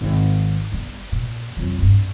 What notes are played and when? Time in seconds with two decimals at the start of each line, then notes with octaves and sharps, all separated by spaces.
0.01 G#1
0.72 G1 G3
1.12 A#2
1.57 F2 F#3
1.78 G#1 G2